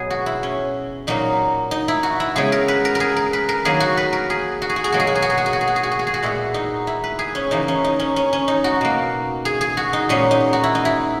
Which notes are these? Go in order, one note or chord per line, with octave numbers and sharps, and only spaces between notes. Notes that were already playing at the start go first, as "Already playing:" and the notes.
Already playing: B2 F#3 B3 G#4
F#4
E4
C#4
A#2 F#3 A#3 D#4
D#4
E4
F#4
E4
C#3 G#3 B3 G#4
A#4
B4
A#4
A#4
G#4
A#4
B4
A#4
D#3 F#3 A#3 G#4
F#4
B4
A#4
G#4
F#4
G#4
F#4
G#4
B2 F#3 A#3 F#4
G#4
F#4
G#4
F#4
G#4
F#4
G#4
F#4
G#4
F#4
G#4
F#4
G#4
F#4
G#4
F#4
A#2 G#3 B3 E4
D#4
E4
B4
G#4
C#4
C#3 E3 A#3 D#4
C#4
D#4
C#4
C#4
C#4
D#4
F#4
B2 A#3
G#4
G#4
F#4
D#4
A#2 G#3 B3 C#4
D#4
F#4
E4
D#4
E4